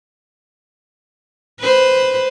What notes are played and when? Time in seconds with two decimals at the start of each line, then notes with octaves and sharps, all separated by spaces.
1.60 B4 C5